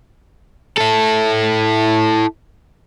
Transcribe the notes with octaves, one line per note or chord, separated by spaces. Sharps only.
E4 A4